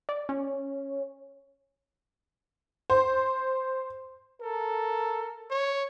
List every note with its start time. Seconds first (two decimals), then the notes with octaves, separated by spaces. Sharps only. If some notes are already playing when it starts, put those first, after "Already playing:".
0.09 D5
0.29 C#4
2.90 C5
4.42 A4 A#4
5.51 C#5